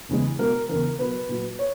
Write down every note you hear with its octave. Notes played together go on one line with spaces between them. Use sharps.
E2 C#3 E3 G#3
B2 G#3 A#4
E2 C#3 E3 A#4
B2 F#3 B4
A#2 F#3
C#5